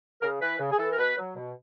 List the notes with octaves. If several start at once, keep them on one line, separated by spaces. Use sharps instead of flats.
C#3 A#4
E3 B4
C#3
G#4
E3 A4
A#4
B2 B4
F#3
B2